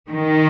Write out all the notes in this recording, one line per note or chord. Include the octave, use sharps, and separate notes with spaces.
D#3